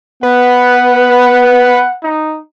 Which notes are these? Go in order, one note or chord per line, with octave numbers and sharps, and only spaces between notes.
B3 B4 F#5
D#4